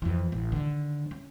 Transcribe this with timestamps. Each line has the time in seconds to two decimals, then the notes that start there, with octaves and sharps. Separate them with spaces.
0.02 F2 E3
0.32 A1
0.52 D3 D#3
1.11 C#4